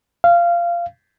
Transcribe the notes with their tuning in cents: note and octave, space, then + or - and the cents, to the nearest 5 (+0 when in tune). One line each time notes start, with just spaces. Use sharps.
F5 -20